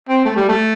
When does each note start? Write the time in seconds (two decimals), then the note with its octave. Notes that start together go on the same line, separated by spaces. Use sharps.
0.09 C4
0.25 A3
0.36 G3
0.48 A3